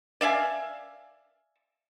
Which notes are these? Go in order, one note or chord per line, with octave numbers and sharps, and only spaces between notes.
D5 E5 F5 G#5